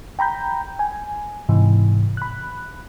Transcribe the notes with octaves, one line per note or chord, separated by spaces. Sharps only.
G5 A#5 B5 G6
G#5
G#2 C3 E3
B5 F#6